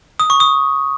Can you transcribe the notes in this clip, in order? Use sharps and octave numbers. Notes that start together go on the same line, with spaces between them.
D#6
C#6
D#6